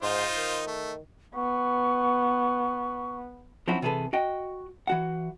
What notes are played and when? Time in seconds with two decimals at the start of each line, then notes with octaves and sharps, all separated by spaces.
0.03 G#2 D#4 F4 C5
0.37 D#3
0.67 A3
1.35 B3 C#6
3.68 F3 F#3 C4 C#4 E4 F#4
3.82 C3 E3 G#4 A4 B4
4.13 F#4 D#5 G5
4.87 E3 F#4 F#5